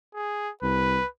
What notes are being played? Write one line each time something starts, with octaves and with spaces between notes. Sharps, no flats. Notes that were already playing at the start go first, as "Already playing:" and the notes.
G#4
C2 B4